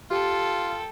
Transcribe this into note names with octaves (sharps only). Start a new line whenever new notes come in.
F4 G4 A4 G5